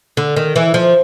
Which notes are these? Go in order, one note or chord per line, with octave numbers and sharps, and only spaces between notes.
D3
D#3
E3
F3